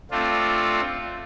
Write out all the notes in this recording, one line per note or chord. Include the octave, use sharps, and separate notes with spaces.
A3 C4 D4 F4